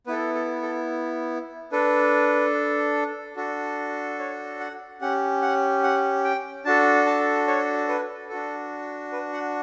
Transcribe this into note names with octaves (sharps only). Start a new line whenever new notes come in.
B3 E4 A4 B4
A4
A4
D4 A4 B4
D4 F#4 A4
C#5
F#5
C#4 G4 F#5
F#5
F#5
G5
D4 F#4 A4 A5
A5
C#5
B4
D4 F#4 A4
B4
F#5